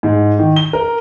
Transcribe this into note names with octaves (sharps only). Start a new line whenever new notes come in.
G#2
D#3
G7
A#4